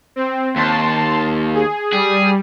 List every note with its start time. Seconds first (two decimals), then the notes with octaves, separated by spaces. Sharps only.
0.16 C4
0.56 D#2 A5 C6
1.54 G#4
1.92 G3 G#4